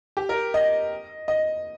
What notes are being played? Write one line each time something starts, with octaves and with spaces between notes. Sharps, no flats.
G4
A#4
D#5
D#5